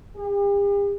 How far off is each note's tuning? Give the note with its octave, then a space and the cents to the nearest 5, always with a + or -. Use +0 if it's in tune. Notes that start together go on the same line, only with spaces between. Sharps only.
G4 +45